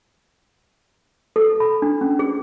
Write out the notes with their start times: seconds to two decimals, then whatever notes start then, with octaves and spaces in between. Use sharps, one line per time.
1.36 A4
1.60 B5
1.82 D4
2.01 C#4
2.19 G#4